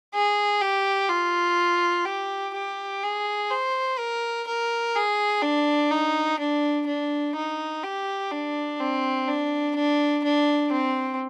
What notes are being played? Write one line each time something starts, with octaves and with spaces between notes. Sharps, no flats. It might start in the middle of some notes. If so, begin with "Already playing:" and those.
G#4
G4
F4
G4
G4
G#4
C5
A#4
A#4
G#4
D4
D#4
D4
D4
D#4
G4
D4
C4
D4
D4
D4
C4